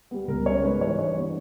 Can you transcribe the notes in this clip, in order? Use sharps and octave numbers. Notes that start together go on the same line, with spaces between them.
G3 B3
C#2 A#4
C#3 G#3 B3 C#5
G#2 B4
E3 G3 C#5
G2 C#5
E3 G3 B3